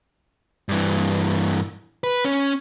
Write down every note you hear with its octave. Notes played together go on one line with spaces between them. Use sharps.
G2 E3
B4
C#4